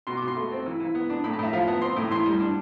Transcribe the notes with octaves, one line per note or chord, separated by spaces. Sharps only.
B2 C6
B2 D6
C6
A3
C4
E3
E3
B3
D4
A2 B5
A5
A2 E5
F3 F5
B3 A5
C4 C6
A2
E3 C6
G3
D4